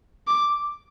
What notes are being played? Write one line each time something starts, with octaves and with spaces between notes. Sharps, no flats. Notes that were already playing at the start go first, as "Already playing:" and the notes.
D6